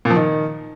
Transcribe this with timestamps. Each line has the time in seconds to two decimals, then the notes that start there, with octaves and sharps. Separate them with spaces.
0.05 A#2
0.11 F3
0.16 D#3